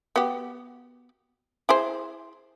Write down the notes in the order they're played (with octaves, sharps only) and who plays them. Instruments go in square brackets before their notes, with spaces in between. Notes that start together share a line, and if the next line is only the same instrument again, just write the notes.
[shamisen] B3 F#4 G4
E4 G#4 C5